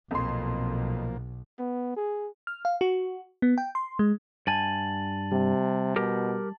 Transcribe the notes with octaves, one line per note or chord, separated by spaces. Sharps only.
B1 F2 A#2 F3 A#3 C6
B3
G#4
F6
F5
F#4
B3
G5
C6
G#3
G2 G#5 A5 A6 F#7
C3 G3
B2 G4 A#4